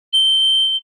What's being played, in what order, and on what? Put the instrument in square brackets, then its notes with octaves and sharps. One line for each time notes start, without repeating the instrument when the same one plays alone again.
[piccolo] G7